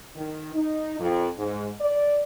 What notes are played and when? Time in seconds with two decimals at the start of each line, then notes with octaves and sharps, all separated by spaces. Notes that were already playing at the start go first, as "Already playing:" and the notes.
0.16 D#3
0.54 D#4
1.00 F2
1.38 G#2
1.80 D5